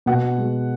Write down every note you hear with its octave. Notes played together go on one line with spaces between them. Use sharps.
B2 F#5
G#3